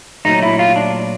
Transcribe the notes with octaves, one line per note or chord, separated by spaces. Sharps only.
A#2 F#3 A3 D#4
E4
F4
D4